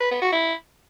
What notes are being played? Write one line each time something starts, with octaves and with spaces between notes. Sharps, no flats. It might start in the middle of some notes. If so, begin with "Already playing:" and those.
B4
B3
F#4
E4